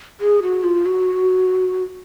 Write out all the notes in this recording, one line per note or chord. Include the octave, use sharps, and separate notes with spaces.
G#4
F#4
F4
F#4